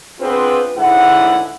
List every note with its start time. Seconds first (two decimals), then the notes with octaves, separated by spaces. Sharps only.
0.21 B3 C4 D4 F4 G#4 B4
0.77 C#2 G#2 D3 E4 F#5